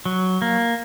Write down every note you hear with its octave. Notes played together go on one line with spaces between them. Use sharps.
F#3
A#3